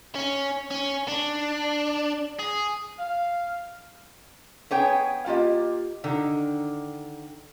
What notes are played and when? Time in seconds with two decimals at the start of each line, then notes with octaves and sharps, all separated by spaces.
0.15 C#4
0.71 C#4
1.08 D4
2.39 G#4
2.99 F5
4.71 B3 G#4 C#5 G5 G#5
5.26 A#3 F4 G4 D#5
6.04 D3 D#3 A#5